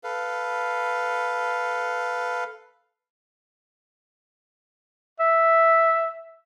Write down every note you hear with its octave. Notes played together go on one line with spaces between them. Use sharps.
A4 B4 F5
E5